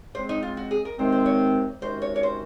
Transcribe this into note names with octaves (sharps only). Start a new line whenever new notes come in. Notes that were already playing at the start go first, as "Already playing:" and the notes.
C#3 G#3 C4 C5
D#4
F4
F#4
G#4
A#4
C3 D#3 G#3 C4 C5
C5
C#5
C3 D#3 G#3 C#4 F#4 C5
C#5
C#5
C5